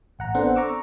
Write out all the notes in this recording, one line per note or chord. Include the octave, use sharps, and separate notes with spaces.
A1 F#5 A#5
B3 C4 D4 A4 C5 F#5
A#5 C#6 D6 E6